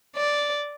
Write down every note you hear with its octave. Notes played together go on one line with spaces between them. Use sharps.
D5